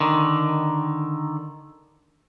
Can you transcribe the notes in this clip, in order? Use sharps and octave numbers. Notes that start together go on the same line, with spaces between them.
D3 D#3